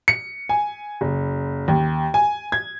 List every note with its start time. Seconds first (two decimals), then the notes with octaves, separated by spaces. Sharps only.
0.08 C#7
0.49 G#5
1.01 F#1
1.68 D#2
2.14 G#5
2.52 G#6